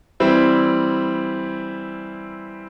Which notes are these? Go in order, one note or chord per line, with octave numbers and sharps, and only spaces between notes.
E3 G3 C4 E4